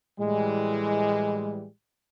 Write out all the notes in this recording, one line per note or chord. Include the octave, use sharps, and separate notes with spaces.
A2 E3 G3 G#3